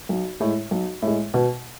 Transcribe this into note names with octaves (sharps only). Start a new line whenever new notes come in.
B1
A2 G#3
B1
A2
G#3
B2